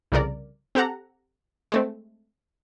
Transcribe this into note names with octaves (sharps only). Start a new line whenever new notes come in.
C2 F2 C#3 A#4 D5
C4 G4 A4 F#5 A#5
G#3 A3 C4